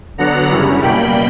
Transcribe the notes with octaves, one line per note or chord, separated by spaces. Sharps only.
D3 F#3 B3 D4 F#5 A#5
F#2 C#3 G3 C#4 E4
B2 G3 A#3 G5 B5